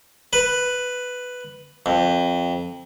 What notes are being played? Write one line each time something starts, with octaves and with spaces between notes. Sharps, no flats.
B4
F2